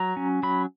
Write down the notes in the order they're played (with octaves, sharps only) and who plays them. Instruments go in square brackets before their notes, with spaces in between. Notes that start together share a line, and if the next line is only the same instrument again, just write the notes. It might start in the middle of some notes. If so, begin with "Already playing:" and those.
Already playing: [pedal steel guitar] F#3 A#5
C#4
F#3 B5